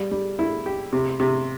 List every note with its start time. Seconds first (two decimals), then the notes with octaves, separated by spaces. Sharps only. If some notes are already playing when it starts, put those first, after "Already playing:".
Already playing: G3
0.11 G3
0.39 E4
0.66 G4
0.93 C3
1.20 C3